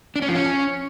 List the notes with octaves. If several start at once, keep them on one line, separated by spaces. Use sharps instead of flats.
D4
C#4
F3
C#4